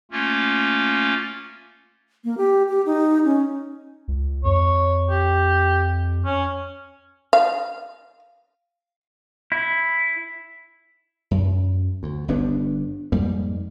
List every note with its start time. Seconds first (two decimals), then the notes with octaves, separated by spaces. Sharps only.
0.11 A3 A#3 C#4 F4
2.24 A#3
2.37 G4
2.68 G4
2.86 D#4
3.25 C#4
4.08 C#2
4.44 F2 C#5
5.10 G4
6.25 C#4
7.33 F5
9.52 E4
11.31 F#2
12.03 D2
12.28 G1 G2 B3 D4
13.12 F2 G#2 G3 A#3